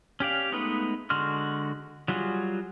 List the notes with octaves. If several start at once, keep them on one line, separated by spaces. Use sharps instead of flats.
C#4 G4 D5 F5
G#3 A3 B3 D#4 B4
D3 G#3 F#4 C6 F6
F#3 G3 F4 F#4 G#4